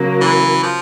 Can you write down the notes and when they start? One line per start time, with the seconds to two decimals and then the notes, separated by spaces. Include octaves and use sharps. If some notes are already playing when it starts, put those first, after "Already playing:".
Already playing: C#3 F#3 A#3
0.21 E3
0.63 F3